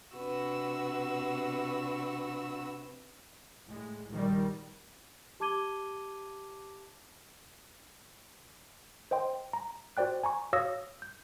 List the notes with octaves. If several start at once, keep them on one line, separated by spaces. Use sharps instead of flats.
C3 D4 F#4 B4 E6
A2 G#3
A#1 D#3 G3
G4 A5 D6 G#6 D#7 G7
C5 D#5 G5 C6
A#5
F#4 C5 D5 G5 F#6
G#5 A#5 C#6
F#4 C#5 F5 D#6 E6 A#6
G6